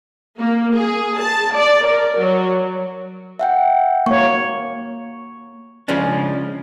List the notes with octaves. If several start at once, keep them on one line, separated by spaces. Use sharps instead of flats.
A#3
G#4
A5
D5
A#4
F#3
E5 F#5 G5
A#3 C#5 C#6
C#3 F3 G#3 C#4 D4